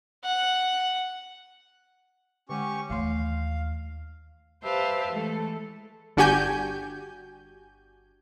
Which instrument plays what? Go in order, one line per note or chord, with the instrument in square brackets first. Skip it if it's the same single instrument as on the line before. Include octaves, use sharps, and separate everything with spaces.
[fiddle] F#5
[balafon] D3 G#3 F#5 [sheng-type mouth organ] C#4 G4 C#6
[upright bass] D#2 [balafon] E3 A3 C6 [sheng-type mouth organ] F5
[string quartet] G4 B4 C5 E5 F5 A5
E3 G#3 A3 A4
[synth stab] G1 D4 F#4 G4 G#5 G6